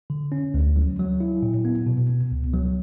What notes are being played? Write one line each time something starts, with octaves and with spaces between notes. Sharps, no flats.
D3
C#4
D2
F#3
F#3
E4
A#2
B3
B2
B3
C#2
F#3